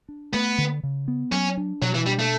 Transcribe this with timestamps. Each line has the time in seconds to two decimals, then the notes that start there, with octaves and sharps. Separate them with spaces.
0.09 D4
0.33 A3 B3
0.58 D3
0.83 C#3
1.08 B3
1.32 F#3 C#4
1.57 D4
1.82 B2 F#3
1.95 E3
2.06 G3 D4
2.19 A3